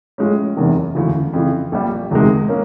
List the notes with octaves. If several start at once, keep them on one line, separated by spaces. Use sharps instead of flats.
A2 F3 G#3 C#4
F#1 E2 C3 D#3
E1 D2 C#3 E3
F2 C#3 E3
A#1 A#2 G3
E1 D2 C3 D#3 G#3
A#3 C#4